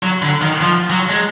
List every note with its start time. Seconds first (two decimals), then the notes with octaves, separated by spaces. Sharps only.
0.03 F#3
0.22 D3
0.42 D#3
0.61 F3
0.90 F#3
1.09 G#3